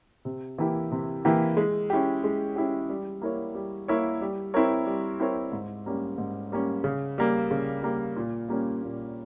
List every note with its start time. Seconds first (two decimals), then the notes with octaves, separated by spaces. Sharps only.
0.25 C3
0.58 E3 A#3 E4 G4
0.91 C3
1.25 E3 A#3 E4 G4
1.57 G#3
1.90 C#4 E4 G4
2.24 G#3
2.56 C#4 E4 G4
2.89 G3
3.21 A#3 E4 A#4 C#5
3.55 G3
3.88 A#3 E4 A#4 C#5
4.21 G3
4.54 C4 E4 A#4 C#5
4.86 G3
5.20 C4 E4 A#4 C#5
5.52 G#2
5.86 G3 A#3 C#4
6.18 G#2
6.52 G3 A#3 C#4
6.84 C#3
7.18 G3 A#3
7.51 C#3
7.83 G3 A#3
8.16 A#2
8.49 G3 A#3 C#4
8.82 A#2